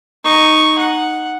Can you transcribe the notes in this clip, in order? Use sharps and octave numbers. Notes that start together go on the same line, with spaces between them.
D#4 C#6
F#5